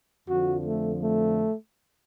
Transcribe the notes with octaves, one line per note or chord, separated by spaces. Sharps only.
F2 D3 F3 F#4
A3
A3